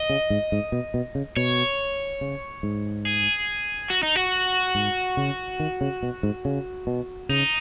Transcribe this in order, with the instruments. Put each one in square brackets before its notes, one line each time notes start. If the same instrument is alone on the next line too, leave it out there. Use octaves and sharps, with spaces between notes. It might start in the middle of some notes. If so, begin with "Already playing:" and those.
Already playing: [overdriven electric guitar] D#5
[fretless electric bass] C#3
G#2
G#2
B2
B2
C#3
[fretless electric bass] B2 [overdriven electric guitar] C#5
[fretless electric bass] C#3
G#2
[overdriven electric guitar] G#4
F#4
D#4
F#4
[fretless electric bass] G#2
C#3
D#3
C#3
B2
G#2
C#3
B2
[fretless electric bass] C#3 [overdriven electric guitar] D#4